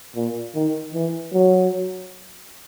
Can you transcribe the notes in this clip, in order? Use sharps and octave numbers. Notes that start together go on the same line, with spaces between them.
A#2
D#3
E3
F#3